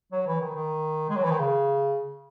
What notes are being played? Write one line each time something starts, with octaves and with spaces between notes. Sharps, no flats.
F#3
E3
D#3
D#3
G#3
F#3
E3
D#3
C#3